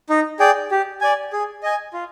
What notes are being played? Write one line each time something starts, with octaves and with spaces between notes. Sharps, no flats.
D#4
G#4 D5 G5
G4
D5 G#5
G#4
D#5 G#5
F4